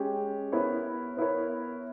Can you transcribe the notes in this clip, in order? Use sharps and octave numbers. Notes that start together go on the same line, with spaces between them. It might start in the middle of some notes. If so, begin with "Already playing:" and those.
Already playing: G#3 C#4 G4
B3 E4 A#4 C#5
B3 E4 A#4 C#5